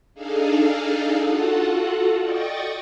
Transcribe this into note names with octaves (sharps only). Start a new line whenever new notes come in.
D4 D#4 G#4 A4 F5
F4 F#4 A4 F#5
D5 D#5 G5 C#6 D#6 A6